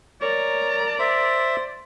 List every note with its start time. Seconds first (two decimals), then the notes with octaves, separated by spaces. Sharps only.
0.21 A#4 C#5 D5 A#5
0.99 C5 E5